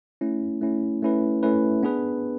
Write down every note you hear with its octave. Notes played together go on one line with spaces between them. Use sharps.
A3 C#4 E4
A3 C#4 E4
A3 C#4 E4 B4
A3 C#4 E4 B4
B3 D4 G#4 B4